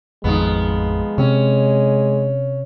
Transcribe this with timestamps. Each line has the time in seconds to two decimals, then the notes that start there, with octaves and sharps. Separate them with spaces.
0.24 A1 F2 D#3 F3 G#3 B3
1.18 C3 C4 C#4